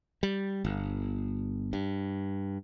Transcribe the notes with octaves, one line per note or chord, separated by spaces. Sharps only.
G3
G1
G2